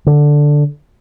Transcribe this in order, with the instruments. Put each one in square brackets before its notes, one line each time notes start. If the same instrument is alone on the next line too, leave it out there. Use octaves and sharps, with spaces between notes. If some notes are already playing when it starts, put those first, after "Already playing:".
[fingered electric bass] D3